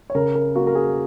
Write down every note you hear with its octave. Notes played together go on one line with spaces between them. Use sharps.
C#5
C#3 A#4
A#4
A#3 F#4
A#4
G#4